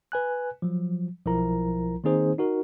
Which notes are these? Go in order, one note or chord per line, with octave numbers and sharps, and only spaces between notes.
B4 G#5 F#6
F3 F#3
B1 F3 E4 A#4 A#5
D#3 A#3 C4 D#4 G#4 C5
D#4 F#4 A#4